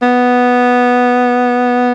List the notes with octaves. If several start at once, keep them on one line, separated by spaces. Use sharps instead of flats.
B3